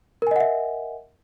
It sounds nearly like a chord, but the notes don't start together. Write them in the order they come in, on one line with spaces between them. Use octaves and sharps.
A#4 G#5 D#5 F#5 E5